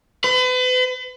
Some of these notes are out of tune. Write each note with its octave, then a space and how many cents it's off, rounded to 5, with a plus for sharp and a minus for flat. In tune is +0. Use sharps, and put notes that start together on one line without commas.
B4 +40